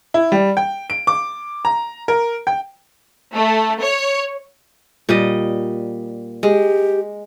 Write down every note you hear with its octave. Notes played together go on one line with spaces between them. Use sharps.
E4
G3
G5
D7
D6
A#5
A#4
G5
A3
C#5
A#2 G3 D#5
G#3 G4